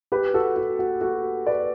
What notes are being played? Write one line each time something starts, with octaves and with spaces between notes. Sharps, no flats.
G4 B4
F#4 A4
F#4
F#4
F#4 A4
B4 D5